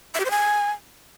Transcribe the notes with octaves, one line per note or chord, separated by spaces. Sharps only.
E5
G4
C5
G#5